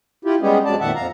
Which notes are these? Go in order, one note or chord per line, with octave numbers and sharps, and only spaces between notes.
E4 F4 G4
G3 G#3 B3 C#4 G4 G#4
F2 F#3 G#3 D5 A5
F2 A#2 D#3 E5 F#5 A5
F2 F5 A#5